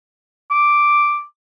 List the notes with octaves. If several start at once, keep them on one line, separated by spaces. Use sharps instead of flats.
D6